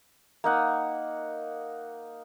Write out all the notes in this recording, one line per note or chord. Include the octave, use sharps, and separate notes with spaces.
A#3 D#4 F#5